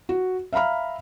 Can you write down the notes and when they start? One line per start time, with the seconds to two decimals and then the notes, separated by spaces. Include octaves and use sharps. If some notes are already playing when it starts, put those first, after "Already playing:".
0.09 F#4
0.53 E5 F5 A#5 B5 F6